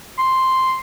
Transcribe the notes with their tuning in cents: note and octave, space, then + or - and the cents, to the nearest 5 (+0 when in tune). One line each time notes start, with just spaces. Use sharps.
C6 +0